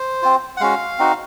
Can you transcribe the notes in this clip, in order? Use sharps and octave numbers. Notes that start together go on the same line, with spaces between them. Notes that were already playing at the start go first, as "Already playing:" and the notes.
Already playing: C5
C4 F4
F#5
G#3 C#4 F#4 F5
C4 D#4 F#4